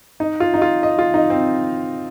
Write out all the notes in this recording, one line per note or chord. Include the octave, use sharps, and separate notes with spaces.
D#4
F4
D#4
F4
D#5
F4
D#4
C4